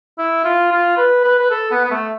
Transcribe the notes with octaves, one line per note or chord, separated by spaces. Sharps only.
E4
F4
F4
B4
B4
B4
A4
B3
B3
A3